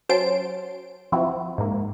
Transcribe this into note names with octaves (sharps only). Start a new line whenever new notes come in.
F#3 C#4 C5 A5 C6 D7
F3 C4 E4 F#4
G#2 A#3